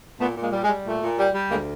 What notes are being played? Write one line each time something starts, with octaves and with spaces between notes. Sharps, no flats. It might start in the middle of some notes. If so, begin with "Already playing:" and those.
A#2 A3 B3
A#2
G#3 A#3
G3
G#3
G3
A#2 A3
A#2
G3
G3
D2 G#3 A#3